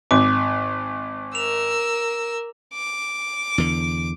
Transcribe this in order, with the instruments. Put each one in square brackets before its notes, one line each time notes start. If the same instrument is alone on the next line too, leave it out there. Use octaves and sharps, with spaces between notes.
[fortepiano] G#1 [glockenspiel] D6
[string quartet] A#4 E6 [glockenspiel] F7
[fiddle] D6
[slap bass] E2 D3